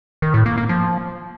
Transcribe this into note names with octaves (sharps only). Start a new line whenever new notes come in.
D#3
A2
A#3
A#3
F3